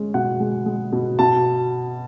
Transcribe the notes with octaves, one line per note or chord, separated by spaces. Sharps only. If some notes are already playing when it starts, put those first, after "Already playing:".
Already playing: G#3 C#4
B2 F#5
G#3
G#3
B2
B2 A5